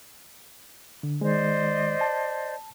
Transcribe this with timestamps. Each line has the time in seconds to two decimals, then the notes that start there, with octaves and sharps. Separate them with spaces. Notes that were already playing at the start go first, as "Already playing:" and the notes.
1.03 D3
1.21 D#3 G#3 C5 D5 D#5
2.01 A5